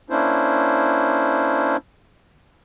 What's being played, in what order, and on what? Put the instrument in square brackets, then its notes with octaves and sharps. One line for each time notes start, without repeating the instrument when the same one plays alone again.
[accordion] A#3 C#4 D4 E4 C5